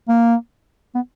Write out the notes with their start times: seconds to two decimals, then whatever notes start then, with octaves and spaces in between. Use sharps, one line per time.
0.09 A#3
0.95 B3